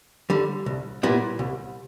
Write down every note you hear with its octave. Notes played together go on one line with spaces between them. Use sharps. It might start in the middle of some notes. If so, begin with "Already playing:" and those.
D3 G3
C2
A#2 G3 B3 E4
C2